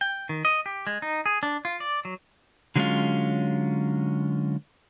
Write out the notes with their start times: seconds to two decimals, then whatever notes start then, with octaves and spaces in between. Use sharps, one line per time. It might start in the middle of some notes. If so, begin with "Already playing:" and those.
0.01 G5
0.29 D#3
0.45 D#5
0.66 G4
0.87 G#3
1.02 D#4
1.26 G#4
1.43 D4
1.65 F4
1.80 D5
2.05 F#3
2.76 D3 F#3 G#3 A3 C#4 F4